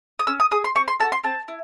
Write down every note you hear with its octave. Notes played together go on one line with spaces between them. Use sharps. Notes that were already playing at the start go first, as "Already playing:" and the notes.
D#6
C#4 E6
D#6
G#4 D#6
C6
C4 C#6
C6
F#4 A4 A5
C6
C4 A5
E4